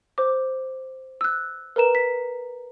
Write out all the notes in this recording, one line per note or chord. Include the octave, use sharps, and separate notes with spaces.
C5 D6
E6 F#6
A#4 B4 A#5 E7
B6